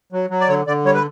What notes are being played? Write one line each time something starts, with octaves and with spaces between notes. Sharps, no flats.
F#3
F#3
D5
D3 C#5
D3 D5
G3 C#5
B4